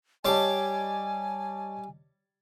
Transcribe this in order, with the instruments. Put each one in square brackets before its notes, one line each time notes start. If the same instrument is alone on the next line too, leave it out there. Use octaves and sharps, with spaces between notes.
[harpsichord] G3 C6 D6 [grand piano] C#5 D#5 A5 [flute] G#5